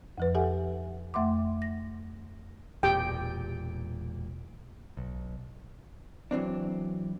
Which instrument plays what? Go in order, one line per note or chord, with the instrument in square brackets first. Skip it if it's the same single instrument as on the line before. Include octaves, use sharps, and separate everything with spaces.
[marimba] F2 F3 B4
G4 A4 E5 F#5 G#5
F2 A3 E5 F#5 C6 D6
A#6
[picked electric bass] E1 A#2 [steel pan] G4 G5
[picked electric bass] B1
[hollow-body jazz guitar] E3 F#3 C4 D4